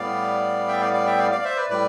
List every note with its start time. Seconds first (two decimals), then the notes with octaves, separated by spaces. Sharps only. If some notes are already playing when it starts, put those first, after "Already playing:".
Already playing: A2 G3 B3 D5 F5
0.68 E5 G5
0.81 D5 F5
0.93 D5 F5
1.06 E5 G5
1.18 D5 F5
1.31 D5 F5
1.44 C5 E5
1.56 B4 D5
1.69 A2 G3 B4 D5